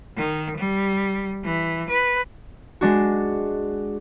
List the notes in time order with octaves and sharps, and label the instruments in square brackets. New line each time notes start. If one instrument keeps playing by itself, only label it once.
[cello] D#3
G3
E3
B4
[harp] G#3 D4 F#4